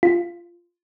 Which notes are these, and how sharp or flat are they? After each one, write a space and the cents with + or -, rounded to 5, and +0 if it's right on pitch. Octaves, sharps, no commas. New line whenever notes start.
F4 -15